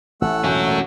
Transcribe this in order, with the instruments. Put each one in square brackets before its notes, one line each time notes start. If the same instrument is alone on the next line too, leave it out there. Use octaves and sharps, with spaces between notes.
[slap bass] A1 A2 [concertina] A3 F#5 E6
[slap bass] E1 A1 A#2 [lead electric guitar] C#4 F#4